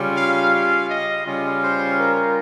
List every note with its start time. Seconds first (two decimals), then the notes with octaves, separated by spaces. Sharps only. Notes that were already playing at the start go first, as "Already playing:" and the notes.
Already playing: C#3 G3 C#4 F4
0.16 F5
0.52 F5
0.90 D#5
1.25 C#3 G3 C#4 F4
1.61 C5
1.98 A#4